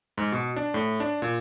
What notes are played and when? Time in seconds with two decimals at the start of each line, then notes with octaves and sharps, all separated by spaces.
0.18 G#2
0.32 B2
0.56 D4
0.74 A2
1.00 D4
1.22 A#2